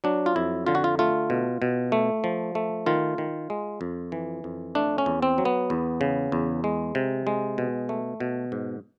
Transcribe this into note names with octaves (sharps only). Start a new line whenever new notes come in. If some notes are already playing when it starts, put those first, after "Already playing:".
F#3 D4
F4
F2 E4
D3 F4
F#4
F4
A3 F4
B2
B2
A3
F3
A3
D#3 F4
D#3
G#3
F2
E3
F2
A3 D4
C#4
E2
C4
F#3
B3
E2
C#3
E2
G#3
C3
G#3
B2
A3
B2
G#2